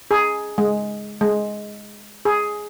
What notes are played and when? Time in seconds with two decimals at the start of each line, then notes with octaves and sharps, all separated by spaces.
0.11 G#4
0.58 G#3
1.21 G#3
2.25 G#4